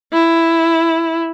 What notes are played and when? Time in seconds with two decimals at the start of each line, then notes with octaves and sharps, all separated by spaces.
0.13 E4